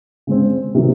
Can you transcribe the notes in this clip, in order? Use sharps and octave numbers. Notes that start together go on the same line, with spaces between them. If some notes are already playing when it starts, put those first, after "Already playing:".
C#3 G#3 C4
C3 D#3 F#3